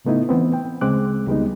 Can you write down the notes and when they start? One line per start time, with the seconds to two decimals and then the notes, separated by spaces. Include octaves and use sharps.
0.05 A2 C#3 A3 B3 D#4 E4
0.29 E3 B3 C4
0.54 G5
0.81 D2 C#3 G#3 C4 D6 F#6
1.27 C#2 G3 G#3 B3 D#4